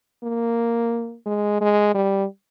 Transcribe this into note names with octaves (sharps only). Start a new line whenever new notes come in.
A#3
G#3
G#3
G3